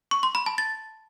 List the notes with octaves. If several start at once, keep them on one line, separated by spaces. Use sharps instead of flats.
C#6
C6
B5
A5
A6